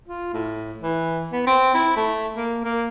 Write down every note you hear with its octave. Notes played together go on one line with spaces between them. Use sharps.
F4
A2
E3
B3
C4
E4
A3
A#3
A#3